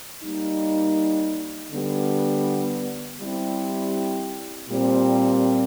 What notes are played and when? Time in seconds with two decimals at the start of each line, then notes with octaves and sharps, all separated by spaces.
0.24 G3 A#3 D#4
1.72 D3 G3 B3
3.21 G3 C4 E4 G4
4.70 A#2 G3 C4